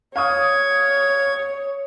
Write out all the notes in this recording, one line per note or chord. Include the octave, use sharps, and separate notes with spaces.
C#5 F5 C#6 D#6 G#6